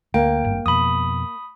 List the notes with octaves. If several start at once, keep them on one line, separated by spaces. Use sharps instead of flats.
D2 A#3 G5
G#1 G2
F2 B2 B5 D#6